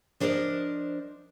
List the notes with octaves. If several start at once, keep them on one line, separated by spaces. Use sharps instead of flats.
F3 D4 A#4 C5 D5 D#5